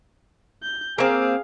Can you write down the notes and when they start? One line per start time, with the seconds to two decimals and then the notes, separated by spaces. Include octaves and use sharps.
0.63 G6
0.98 A#3 C4 G#4 F5